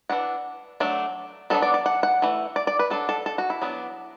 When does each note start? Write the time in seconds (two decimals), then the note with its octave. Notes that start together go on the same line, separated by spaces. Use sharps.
0.09 E3 D4 F#5
0.80 F#3 A3 D4
1.50 F#3 B3 D4 A4
1.62 D5
1.74 D5
1.86 F#5
2.03 F#5
2.22 E3 A3
2.56 D5
2.67 D5
2.79 B4
2.90 F#3 D4 A4
3.09 A4
3.26 A4
3.38 F#4
3.50 E4
3.62 F#3 B3 D4